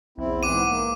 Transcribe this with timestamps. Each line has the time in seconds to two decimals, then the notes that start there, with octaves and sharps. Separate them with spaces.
0.18 B1 E2 C4 E4
0.43 G#2 E3 F#5 D6 D#7
0.68 A#3